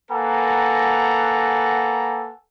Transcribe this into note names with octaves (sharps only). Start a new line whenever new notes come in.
A#3 A4 B4 F#5 G#5 A#5